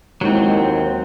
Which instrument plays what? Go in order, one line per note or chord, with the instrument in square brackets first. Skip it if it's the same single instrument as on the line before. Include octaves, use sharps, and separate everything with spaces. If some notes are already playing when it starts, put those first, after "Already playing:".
[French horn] D#2 [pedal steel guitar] F#3 C4 [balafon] G#3 D#4 E4